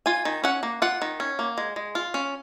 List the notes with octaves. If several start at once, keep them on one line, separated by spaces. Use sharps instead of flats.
F4 G#5
D#3
C#4 F#5
A#3
F4 F#5
D#3
C#4
A#3
G#3
G#3
F4
C#4